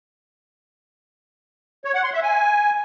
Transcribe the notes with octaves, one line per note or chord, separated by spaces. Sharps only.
C#5
F#5
C6
E5
G#5